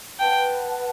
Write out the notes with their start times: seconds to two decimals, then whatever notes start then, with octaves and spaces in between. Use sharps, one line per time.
0.20 B4 F#5 G5 A5